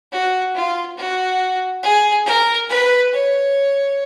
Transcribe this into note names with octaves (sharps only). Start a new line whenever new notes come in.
F#4
F4
F#4
G#4
A#4
B4
C#5